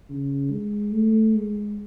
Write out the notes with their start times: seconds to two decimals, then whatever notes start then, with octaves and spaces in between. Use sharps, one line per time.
0.09 C#3
0.51 G#3
0.93 A3
1.35 G#3